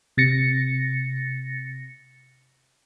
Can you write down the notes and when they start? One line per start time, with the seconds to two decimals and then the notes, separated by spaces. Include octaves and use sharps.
0.17 C3 A6 A#6 C#7